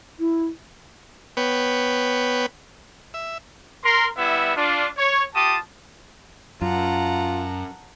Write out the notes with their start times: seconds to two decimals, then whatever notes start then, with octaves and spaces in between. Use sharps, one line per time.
0.20 E4
1.37 B3 B4 C#5 G5
3.14 E5
3.84 A#4 C6
4.18 G3 B3 E4 E5
4.57 D4 F4
4.97 C#5
5.35 F4 G4 A5 D#6
6.62 F#2 F4 F#5 A5 A#5